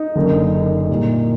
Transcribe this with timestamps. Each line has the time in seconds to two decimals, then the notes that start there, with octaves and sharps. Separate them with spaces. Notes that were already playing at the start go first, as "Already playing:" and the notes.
Already playing: D#4
0.16 F#1 F#2 D3
0.53 D#4
0.89 C2 A#2